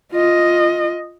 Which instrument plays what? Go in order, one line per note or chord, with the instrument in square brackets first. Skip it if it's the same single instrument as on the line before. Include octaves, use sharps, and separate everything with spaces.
[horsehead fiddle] F4 D#5